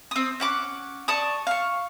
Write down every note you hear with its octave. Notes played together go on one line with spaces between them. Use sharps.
C4 D#6
C#4 F#5 D6
D5 A5 C#6 D#6
F5 C#6